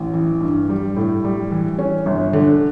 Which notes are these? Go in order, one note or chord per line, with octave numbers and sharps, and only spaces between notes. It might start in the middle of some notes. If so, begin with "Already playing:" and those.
Already playing: A1
E3
G2
G3
A2
G3
E3
C#4
G1
D3